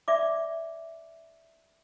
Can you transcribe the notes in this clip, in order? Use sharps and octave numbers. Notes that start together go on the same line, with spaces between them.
D5 E5 D6